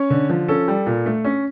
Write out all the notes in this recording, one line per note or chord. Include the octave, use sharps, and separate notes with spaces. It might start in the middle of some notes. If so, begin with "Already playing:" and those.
Already playing: C#4 C#5
D3
F3
C#4 A4
G3
A#2
A3
C#4